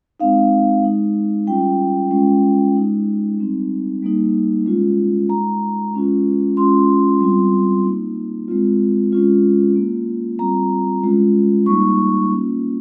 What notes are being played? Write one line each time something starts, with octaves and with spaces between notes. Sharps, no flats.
G#3 C4 D#4 F5
G#3 D#4
G3 C#4 F4 G5
G#3 C#4 F4
G#3 D#4
G3 C4 D#4
G3 A#3 D#4
G#3 C#4 F4
G#3 D#4 A#5
G#3 C#4 F4
G#3 C#4 F4 C6
G3 C4 F4
A#3 D#4
G#3 C4 F4
G#3 C#4 F4
A#3 F4
G3 C4 F4 A#5
G#3 C#4 F4
G3 A#3 D#4 C#6
A#3 C#4 F4